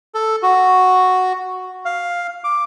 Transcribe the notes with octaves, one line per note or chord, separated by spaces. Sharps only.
A4
F#4
F5
D6